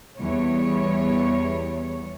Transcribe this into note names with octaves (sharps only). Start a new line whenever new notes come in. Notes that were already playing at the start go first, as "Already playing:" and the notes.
E2 G3 C#5